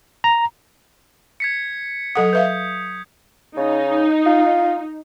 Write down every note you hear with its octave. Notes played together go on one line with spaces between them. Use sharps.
A#5
G#6 B6 C#7
F#3 A4 F#5 D#6
B4 E5 F5 G6
C#3 D#4
F4